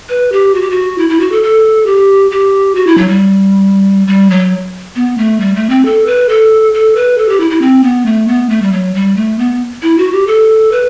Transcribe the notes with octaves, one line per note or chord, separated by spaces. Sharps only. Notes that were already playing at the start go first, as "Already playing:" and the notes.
B4
G4
F#4
G4
F#4
E4
E4
F#4
A4
A4
G4
G4
F#4
E4
F#3
G3
G3
F#3
B3
A3
G3
A3
C4
A4
B4
A4
A4
B4
A4
G4
E4
E4
C4
B3
A3
B3
A3
G3
F#3
G3
A3
B3
E4
F#4
G4
A4
B4